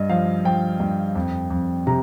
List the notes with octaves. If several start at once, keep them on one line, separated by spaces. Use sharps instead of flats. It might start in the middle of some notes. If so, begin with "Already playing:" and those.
Already playing: G2 D#5
F3 F5
F3 G5
G2
F2
F2
C3 A#5